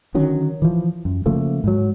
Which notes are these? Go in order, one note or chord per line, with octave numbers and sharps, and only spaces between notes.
D3 D#3 F#3 C#4
E3 F3
F#2
C#3 F3 A3 A#3
G#2 F#3